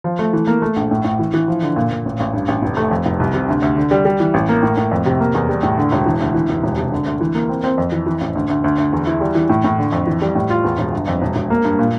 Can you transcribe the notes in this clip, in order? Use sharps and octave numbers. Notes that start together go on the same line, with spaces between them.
F3
A3
E3
A#3
A3
A#1
A2
A2
E3
E3
F3
D3
A#2
A#2
A1
A1
G2
A1
F1
A3
F2
F1
C2
C3
D2
D2
D3
G3
G3
E3
A1
A#3
A2
A2
F2
C3
A#3
E2
G3
A2
D3
E1
E3
D2
E3
F1
E1
C3
D3
D2
E3
A#3
C4
C4
F2
E3
E3
A1
D2
D2
D2
D2
E2
E4
G3
E3
A2
A2
D3
F2
E3
G3
A2
F4
E2
E1
G1
F2
E1
E1
A#3
G2
A#2